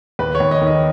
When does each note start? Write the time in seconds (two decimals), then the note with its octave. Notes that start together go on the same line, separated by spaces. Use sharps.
0.19 D#2 B4
0.35 C#5
0.40 D#2
0.51 D#5
0.61 D#3
0.67 D#5